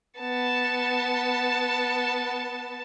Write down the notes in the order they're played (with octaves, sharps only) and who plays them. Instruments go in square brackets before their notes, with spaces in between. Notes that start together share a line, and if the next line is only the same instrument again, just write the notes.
[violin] B3 A5